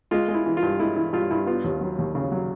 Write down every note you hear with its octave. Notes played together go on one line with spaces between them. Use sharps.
G#3 F4
G#3
E4
E3
F4
G2
G#3 E4
E3 E4
G2 F4
G2 E4
B3 F4
D#2
F#3
D#2
C#3
F#3